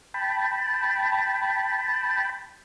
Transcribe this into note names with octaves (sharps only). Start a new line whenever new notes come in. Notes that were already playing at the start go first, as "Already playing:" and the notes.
G5 A5 B5